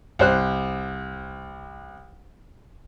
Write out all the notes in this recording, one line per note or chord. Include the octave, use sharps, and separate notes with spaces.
C2 C5 F#6